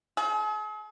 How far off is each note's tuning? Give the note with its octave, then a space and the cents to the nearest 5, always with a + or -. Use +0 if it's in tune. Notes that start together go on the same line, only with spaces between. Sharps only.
G#4 +45